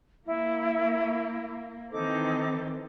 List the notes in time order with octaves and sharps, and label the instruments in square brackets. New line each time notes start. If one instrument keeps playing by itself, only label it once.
[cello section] A#3 [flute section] E4
[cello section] D#3 E3 C4 [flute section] D#4 A4 D6